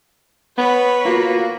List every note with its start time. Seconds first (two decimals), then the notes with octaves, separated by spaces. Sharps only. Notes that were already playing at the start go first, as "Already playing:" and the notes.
0.58 B3 B4 C#5
1.05 A#3 F4 F#4